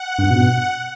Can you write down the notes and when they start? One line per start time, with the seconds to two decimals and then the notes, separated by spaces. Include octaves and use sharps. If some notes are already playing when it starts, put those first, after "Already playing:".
Already playing: F#5
0.19 G2
0.30 B2